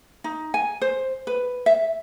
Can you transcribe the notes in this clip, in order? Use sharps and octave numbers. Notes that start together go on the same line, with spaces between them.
D#4
G#5
C5
B4
E5